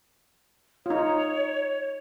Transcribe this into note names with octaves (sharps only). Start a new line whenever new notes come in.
D#4 F4 C#5